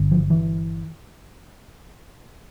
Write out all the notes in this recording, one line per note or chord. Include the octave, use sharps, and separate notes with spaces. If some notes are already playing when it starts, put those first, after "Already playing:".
Already playing: G1 G2 D3
F3
E3